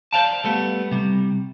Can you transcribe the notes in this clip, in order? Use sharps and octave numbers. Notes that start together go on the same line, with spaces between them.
C5 D5 F5 G5 A5
G3 A3 B3
C3 G3